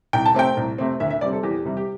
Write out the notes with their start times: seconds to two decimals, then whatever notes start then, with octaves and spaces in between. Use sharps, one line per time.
0.13 C2 G5
0.26 A5
0.34 C3 A3 C4 G5
0.57 C2
0.78 C3 A3 C4
1.00 D2 E5
1.11 E5
1.21 C3 G3 C4 D5
1.33 A4
1.43 E2 G4
1.65 C3 G3
1.77 G4